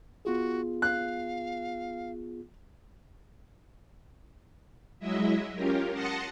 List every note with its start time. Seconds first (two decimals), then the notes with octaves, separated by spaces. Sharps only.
0.25 B3 F4 F#4 G#4
0.82 F5 F#6
5.00 F#3 G#3 E4 D#5 E5
5.54 C#4 F4 G4 A#4
5.93 F#5 A5 C6 D#6 A#6 C#7